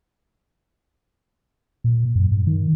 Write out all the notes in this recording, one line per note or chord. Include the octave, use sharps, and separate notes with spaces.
A#2
F#2
G2
D#3